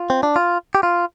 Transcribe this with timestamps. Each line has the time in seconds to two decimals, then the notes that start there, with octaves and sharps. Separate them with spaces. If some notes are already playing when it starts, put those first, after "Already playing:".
Already playing: F4
0.10 C4
0.23 D4
0.36 F4
0.75 G4
0.83 F4